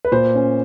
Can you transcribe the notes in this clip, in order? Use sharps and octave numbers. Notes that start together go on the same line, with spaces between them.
B4
A#2 C5
C#4